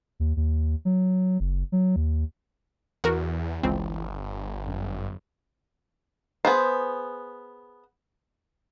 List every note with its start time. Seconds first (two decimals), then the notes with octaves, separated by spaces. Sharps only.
0.20 D#2
0.36 D#2
0.85 F#3
1.40 F#1
1.72 F#3
1.96 D#2
3.04 E2 E3 F#4 A#4
3.64 G1 C#2 C4
4.67 F#2
6.45 B3 G#4 C5